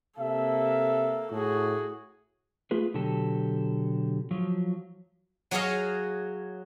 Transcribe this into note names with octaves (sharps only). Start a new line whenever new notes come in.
C3 A#3 A4 E5
A2 F#4 G#4
A3 F4 G#4 B4
B2 D3 F#3 G4 A4
F3 F#3
F#3 F#4 G#4 C#5 D#5 F5